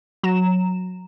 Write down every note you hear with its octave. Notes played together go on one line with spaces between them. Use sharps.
F#3 A#5 E7